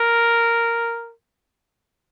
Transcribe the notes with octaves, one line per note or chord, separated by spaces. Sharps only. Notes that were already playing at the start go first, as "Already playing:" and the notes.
Already playing: A#4